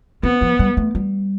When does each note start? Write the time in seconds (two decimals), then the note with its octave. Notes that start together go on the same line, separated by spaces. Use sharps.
0.23 B3 C4
0.41 F3
0.59 G3
0.77 A3
0.95 G3